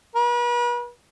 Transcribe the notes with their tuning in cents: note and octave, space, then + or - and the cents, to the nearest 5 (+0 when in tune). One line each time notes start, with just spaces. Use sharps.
B4 -40